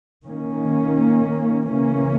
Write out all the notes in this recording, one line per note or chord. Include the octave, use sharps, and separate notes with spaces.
D#3 A#3 C#4
C#3 E3 A#3 C#4